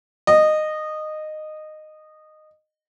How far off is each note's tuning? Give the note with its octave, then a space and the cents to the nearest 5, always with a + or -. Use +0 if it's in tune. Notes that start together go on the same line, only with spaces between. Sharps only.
D#5 -15